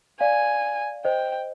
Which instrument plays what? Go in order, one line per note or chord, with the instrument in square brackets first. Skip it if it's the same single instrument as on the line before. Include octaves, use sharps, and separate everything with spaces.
[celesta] D5 F5 [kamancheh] G#5
[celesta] C5 D#5 [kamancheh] G5